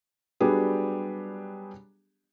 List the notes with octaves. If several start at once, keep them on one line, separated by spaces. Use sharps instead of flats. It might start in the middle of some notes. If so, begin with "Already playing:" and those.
F#3 G3 B3 D4 G4 G#4